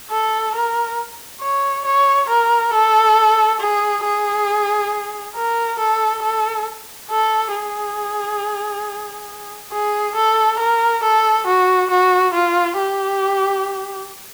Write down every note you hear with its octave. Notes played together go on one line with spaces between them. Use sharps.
A4
A#4
C#5
C#5
A#4
A4
G#4
G#4
A#4
A4
A4
A4
G#4
G#4
A4
A#4
A4
F#4
F#4
F4
G4